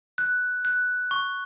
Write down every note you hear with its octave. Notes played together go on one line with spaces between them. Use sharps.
F#6
F#6
C#6